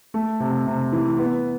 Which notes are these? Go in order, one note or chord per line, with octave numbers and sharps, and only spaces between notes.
A3
C3
C3
E3
B3